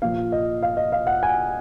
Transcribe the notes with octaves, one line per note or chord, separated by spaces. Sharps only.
A#2 F3 F5
D#5
F5
D#5
F5
F#5
G#5